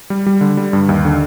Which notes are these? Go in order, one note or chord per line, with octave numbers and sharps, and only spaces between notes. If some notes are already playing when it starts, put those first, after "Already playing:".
G3
G3
D3
G3
G2
D#2
D3